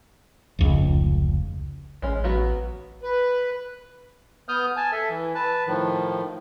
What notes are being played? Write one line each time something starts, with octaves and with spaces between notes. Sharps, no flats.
F1 C#2
A1 G#3 C#4
F#3 B3 F#4
B4
B3 D#6 F6 G6
G#5 A5
A4 E5
E3
B4 A5
A2 D#3 F3